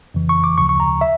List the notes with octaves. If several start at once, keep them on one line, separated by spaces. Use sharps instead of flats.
F2 C#3 E3
C#6
D6
D2 C#3 F3 C#6
C#6
A#5
E5